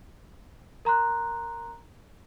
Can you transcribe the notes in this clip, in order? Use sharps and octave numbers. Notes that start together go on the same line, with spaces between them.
A#4 A#5 C6 F#6